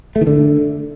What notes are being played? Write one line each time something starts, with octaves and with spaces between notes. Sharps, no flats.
A3
D#3
D3